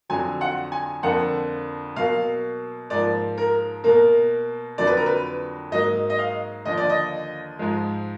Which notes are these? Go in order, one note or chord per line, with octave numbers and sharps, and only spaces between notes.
F2 D3 F#3 G#5
F#5
G#5
F2 D3 F3 A#3 F#5
B2 F#3 A#3 F5
G#2 F3 A#3 D5
A#4
B2 A#3 A#4
F2 D3 F#3 A#3 D5
B4
A#4
B4
G#2 F#3 A#3 D#5
D#5
F5
D#2 D3 F3 D#5
D5
D#5
G#2 F3 G#3